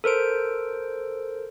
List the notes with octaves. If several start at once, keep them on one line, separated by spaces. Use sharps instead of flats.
A4 A#4 C5 D7